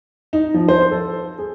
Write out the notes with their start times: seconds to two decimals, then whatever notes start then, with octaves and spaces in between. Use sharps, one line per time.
0.33 D#4
0.54 F3
0.68 C5
0.91 A4
1.38 G#4